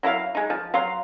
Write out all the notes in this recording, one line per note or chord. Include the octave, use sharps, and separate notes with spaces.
F#3 E4 A#4 F5
G#3 D#4
F3
F#3 F5 A#5 C6